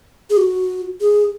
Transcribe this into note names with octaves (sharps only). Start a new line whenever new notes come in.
G#4
F#4
G#4